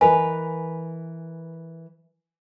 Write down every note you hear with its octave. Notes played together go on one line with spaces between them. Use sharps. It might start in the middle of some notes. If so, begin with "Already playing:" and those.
E3 A#4 B4 D#5 G#5